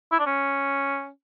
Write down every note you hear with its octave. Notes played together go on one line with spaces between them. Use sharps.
E4
D4
C#4